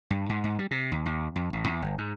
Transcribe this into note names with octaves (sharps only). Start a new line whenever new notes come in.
G2
G#2
G#2
G3
C3
D#2
D#2
F2
A1
E2
G1
G#2